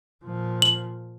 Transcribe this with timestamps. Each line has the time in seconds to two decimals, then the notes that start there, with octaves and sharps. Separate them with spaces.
0.24 A#2 F3
0.62 F#7